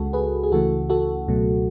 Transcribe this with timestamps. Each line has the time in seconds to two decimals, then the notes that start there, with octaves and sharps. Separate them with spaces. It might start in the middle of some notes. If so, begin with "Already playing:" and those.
Already playing: C#2 C#3 G#3 F#4 A4
0.13 G#4 B4
0.43 G#4
0.52 C#2 C#3 E3 A3 F#4 A4
0.90 F#4 A4
1.28 C#2 B2 F#3 A3